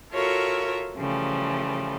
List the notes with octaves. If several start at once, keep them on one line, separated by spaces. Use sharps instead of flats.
F4 F#4 A4 A#4 C#5 E5
C#3 E3 F3 G3 A3